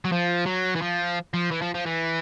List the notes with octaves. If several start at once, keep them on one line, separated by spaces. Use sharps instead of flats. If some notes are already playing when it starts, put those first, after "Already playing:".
F#3
F3
F#3
E3
F3
F3
E3
F3
F3
E3